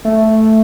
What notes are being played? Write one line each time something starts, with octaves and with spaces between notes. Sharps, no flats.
A3